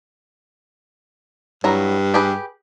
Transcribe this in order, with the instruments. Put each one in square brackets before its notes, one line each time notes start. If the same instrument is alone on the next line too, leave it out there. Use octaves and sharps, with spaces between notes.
[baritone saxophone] G2 [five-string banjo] F#3 E4 A#5
[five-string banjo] G4 G#4 B4